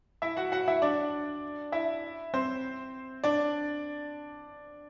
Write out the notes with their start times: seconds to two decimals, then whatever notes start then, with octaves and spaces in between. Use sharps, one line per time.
0.22 E4 E5
0.37 F#4 F#5
0.52 F#4 F#5
0.68 E4 E5
0.82 D4 D5
1.72 E4 E5
2.34 C4 C5
3.24 D4 D5